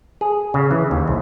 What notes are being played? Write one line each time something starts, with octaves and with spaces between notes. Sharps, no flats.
G#4
C#3
E3
D#2
C2